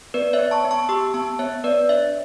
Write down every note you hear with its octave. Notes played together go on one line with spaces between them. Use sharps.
B3 B4 D5
C#5 E5
B3
A5 C#6
B3
A5 C#6
G4 C#6 E6
B3 A5 C#6
B3 C#5 E5
B3 B4 D5
D4 C#5 E5